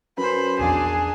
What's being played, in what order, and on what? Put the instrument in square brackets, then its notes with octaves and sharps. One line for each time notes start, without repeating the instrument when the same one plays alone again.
[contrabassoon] F#2 [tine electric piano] B4 [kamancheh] C5 B5
[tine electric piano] A#1 E2 F5 [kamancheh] D4 G#4